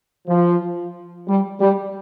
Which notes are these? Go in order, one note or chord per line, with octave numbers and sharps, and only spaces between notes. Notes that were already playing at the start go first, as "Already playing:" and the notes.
F3
G3
G3